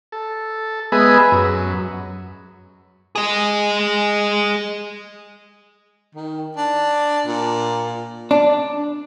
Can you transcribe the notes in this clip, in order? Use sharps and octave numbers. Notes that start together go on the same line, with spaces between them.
A4
G#3 B3 G#4 B4 D#5 E5
F#2
G#4 D#5
D#3
D4
A#2
D4